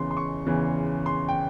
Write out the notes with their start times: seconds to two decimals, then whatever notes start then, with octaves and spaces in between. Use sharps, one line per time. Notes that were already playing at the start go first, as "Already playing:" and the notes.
Already playing: E2 C#3 E3 C6
0.11 C6
0.17 C#6
0.46 E2 C#3 E3
1.06 C6
1.29 G5